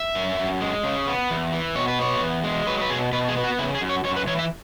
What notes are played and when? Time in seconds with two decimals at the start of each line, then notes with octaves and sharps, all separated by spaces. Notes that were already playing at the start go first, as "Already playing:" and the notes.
Already playing: E5
0.15 F#2
0.39 F#2
0.61 G#3
0.84 C#3
1.07 B3
1.31 E2
1.53 E3
1.75 B2 C#5
1.88 B4
1.99 B3 C#5
2.21 E2
2.44 G#3
2.67 F#3 B4
2.81 B4
2.90 B2 G#4
3.13 B2 B4
3.29 G#4
3.36 B3
3.44 F#4
3.59 C#3 E4
3.75 G#4
3.81 F#2
3.89 C#5
4.04 F#2 C#5
4.16 B4
4.27 E3 C#5
4.39 E5